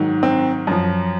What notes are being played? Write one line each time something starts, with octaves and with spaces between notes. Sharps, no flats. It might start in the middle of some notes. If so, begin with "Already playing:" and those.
Already playing: G#2 D#3 F#3
C4
F#2 F3